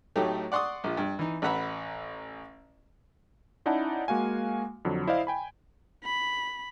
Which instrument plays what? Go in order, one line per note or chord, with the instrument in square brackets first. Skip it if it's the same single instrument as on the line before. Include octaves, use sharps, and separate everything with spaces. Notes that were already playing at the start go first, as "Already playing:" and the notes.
[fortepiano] A2 F#3 A3 D#4 G4
D5 F#5 C6 C#6 D#6
A#1 F4
G2
E3 D#4
A1 B4 E5 F#5 A#5 B5
[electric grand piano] C#4 D#4 E4 D5 F#5 A5
G#3 A#3 F#4 F5 G#5
F2 D3 F#3
E4 C5 D5 D#5 F5
G5 G#5 B5
[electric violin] B5